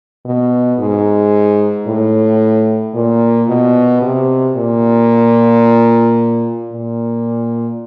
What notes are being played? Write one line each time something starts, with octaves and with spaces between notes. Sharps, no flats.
B2
G#2
A2
A#2
B2
C3
A#2
A#2